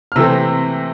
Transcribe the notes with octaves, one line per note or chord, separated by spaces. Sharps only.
F6
C3 E3 A3 C4 E6